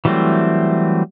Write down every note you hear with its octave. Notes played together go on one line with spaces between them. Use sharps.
E3 F#3 G3 A3 C4